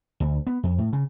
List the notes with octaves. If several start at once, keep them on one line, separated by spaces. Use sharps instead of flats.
D2
B3
F2
A2
C#3